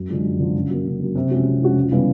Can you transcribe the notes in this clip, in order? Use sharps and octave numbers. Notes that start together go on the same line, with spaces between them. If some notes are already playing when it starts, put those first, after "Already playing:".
Already playing: F#2
D3 F3 G#3
F#2
D3 F3 G#3
C#3
F#3 A#3
C#3
F#3 A#3
C3
F3 G#3 C#4 F#4
C3
F3 G#3 C#4 F#4
C#2
C#3 E3 G3 B3